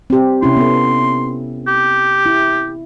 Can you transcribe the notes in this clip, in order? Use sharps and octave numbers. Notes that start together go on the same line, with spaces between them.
C4 G4
C3 C#4 E4 C6
B3 A4
G4
E4